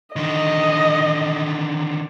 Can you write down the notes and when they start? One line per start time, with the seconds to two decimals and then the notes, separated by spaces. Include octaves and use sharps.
0.16 D3 D#3 D#5